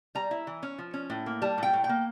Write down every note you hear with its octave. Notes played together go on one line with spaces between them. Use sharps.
G3 A#5
E4
E3
C#4
F3
C#4
A2
A#3
G3 A5
A2 G5
A2
G5
A#3